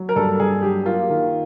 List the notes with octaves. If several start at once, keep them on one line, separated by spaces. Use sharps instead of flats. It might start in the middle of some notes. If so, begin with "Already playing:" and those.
Already playing: F#3
A#4
G2 A4
G2 G#4
F#3 G4
A#3 F4
D#3